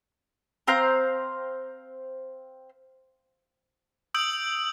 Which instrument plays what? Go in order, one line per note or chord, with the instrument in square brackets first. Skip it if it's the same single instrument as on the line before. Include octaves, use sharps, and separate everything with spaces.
[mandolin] C4 C5 F5 A#5
[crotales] D#6 E6 G6 D7 F#7